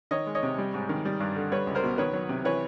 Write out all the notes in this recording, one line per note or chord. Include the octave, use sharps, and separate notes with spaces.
D#3 C#5 D#5
G#3
C#5 D#5
C3
G3
G#2
D#3
G3
G2
D3
G3 B4 C#5
C#2
A#4 C5
B2
D#3 B4 C#5
F#3
C3
E3 B4 C#5